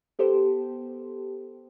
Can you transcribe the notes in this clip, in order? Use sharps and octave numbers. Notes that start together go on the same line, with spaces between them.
B3 G4 A4 C5